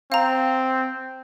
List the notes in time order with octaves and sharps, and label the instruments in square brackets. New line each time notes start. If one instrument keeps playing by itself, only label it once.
[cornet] C4 [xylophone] F5 A#5